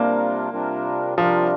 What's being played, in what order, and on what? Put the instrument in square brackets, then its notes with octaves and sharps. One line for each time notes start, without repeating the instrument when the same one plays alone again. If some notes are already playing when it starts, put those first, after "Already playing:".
Already playing: [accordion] C3 G3 D4 F4 A#4 [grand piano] A#3
[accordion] C3 G3 D4 F4 A#4
[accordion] C3 G3 D4 F4 A#4 [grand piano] F3